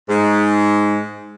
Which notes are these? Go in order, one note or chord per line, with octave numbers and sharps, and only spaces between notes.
G#2